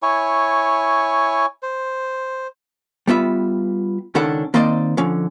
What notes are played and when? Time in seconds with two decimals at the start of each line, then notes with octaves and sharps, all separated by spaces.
0.03 E4 C#5 G#5 C#6
1.63 C5
3.07 G3 B3 F4 E5
4.15 C#2 D#3 C#4 D4 A4 F#5
4.54 D#3 A#3 C4 C5 D5 D#5
4.97 D3 F3 C#4